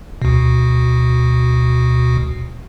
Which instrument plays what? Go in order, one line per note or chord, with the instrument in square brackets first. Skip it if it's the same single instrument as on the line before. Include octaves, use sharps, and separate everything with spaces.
[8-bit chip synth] D2 B2